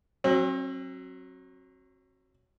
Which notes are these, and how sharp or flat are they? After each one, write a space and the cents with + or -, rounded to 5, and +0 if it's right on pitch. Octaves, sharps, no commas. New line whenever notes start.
F#3 +0 C4 +40